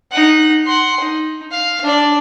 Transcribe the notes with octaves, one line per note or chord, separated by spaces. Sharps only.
D#4 F#5
F#5 C6
D#4
F5
D4 D5